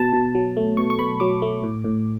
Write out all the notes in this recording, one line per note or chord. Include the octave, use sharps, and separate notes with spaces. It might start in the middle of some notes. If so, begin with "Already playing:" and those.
Already playing: B2 A5
B2
F#3
A3
B2 C#6
C#6
B2 B5
F#3 D6
A3
A2
A2